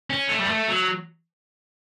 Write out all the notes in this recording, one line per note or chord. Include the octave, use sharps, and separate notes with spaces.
C#4
A3
G3
A3
F#3